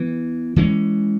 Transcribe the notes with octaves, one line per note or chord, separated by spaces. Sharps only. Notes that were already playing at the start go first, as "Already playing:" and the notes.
Already playing: E3 B3
E3 G#3 C#4